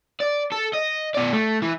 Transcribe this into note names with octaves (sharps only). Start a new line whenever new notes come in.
D5
A4
D#5
B2 D5
A3
E3